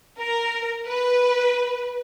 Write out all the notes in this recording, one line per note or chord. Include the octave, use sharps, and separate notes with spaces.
A#4
B4